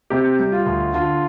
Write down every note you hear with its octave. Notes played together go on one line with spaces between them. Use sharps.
C3 G4
G3
F4
D2
D3 F4